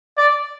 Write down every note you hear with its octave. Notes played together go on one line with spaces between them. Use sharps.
D5